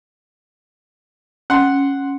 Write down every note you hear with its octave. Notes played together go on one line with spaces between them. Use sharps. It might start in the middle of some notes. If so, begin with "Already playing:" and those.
C#4 F#5 C6